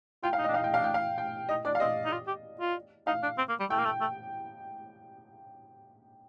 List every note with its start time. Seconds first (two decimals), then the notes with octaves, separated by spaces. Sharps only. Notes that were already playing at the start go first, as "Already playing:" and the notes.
0.23 F4 G5
0.33 F5
0.38 D#4
0.44 D#5
0.48 D4
0.54 D#4 F5
0.64 G5
0.70 D4 F5
0.84 G5
0.94 F5
1.18 G5
1.49 D#4 D#5
1.65 D4 D5
1.75 F5
1.80 C4 D#5
2.05 D#4
2.12 F4
2.27 G4
2.60 F4
3.07 D#4 F5
3.23 D4
3.38 C4
3.49 A#3
3.60 G3
3.70 A3 G5
3.79 A#3
3.85 A3
4.01 A3